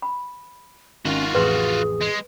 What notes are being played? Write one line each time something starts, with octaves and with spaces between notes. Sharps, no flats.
B5
G#1 D#3 C#4 F4 F#4
A1 F2 G#4 B4 C6
G#3